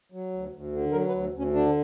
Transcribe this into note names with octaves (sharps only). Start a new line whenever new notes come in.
F#3
D2
D2
D3
F#3 A#4
B4
D2
D2
C#4
D3 D4